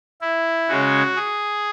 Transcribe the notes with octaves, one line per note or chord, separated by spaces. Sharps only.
E4
C#3 G#3 C#4 F#4
G#4